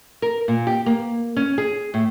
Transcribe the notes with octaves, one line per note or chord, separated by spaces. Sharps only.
A#4
A#2
G4
A#3
C#4
G#4
A2